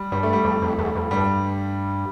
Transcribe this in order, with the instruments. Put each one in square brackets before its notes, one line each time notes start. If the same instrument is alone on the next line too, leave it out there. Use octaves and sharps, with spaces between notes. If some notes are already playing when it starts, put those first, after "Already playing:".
Already playing: [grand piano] G3
[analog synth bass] G2 [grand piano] G3
[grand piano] A3
G3
[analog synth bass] F2
F2
E2
F2
[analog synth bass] G2 [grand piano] G3